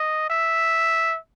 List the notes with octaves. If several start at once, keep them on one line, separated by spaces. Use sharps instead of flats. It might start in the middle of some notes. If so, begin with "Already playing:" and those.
Already playing: D#5
E5